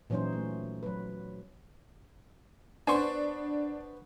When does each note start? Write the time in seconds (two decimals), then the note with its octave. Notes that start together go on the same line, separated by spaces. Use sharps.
0.10 A#2 E3 F#3 C#4 D#4 C5
0.33 A3
0.83 F#3 B4
2.87 B3 D4 C5 G#5 C6 C#6